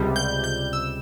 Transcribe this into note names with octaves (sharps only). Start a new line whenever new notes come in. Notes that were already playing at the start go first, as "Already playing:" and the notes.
Already playing: C#2 C3 G3
G6
G6
E6